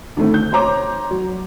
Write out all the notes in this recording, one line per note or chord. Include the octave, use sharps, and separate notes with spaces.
D2 D#3 A3 C4
G6
C5 C#5 A#5 D6
F#3